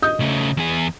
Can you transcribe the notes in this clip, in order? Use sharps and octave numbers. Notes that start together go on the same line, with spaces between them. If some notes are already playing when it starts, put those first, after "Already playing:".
D#5 D#6 G6
C#3 A3
E2 G#4